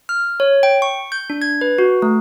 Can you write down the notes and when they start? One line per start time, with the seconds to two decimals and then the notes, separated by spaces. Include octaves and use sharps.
0.09 F6
0.40 C#5
0.63 G5
0.82 C#6
1.12 G6
1.30 D4
1.42 G#6
1.61 B4
1.78 F#4
2.02 A3